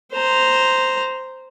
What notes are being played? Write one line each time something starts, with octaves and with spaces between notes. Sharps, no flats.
C5 A#5